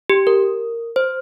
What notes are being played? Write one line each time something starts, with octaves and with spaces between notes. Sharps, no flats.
G4
A#4
C5